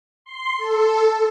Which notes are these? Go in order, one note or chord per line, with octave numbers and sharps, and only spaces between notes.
C6
A4